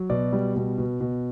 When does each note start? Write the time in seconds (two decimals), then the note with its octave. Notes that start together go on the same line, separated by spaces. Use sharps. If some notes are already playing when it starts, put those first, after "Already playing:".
Already playing: F#3
0.10 B2 D5
0.33 G3
0.56 B2
0.78 B2
1.01 B2